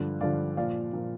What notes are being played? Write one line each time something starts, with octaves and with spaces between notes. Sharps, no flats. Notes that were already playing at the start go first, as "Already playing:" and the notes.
Already playing: G2 D3 F3
G2 D3 F3 D5 F5
A#2 F3 D5 F5
A#2 F3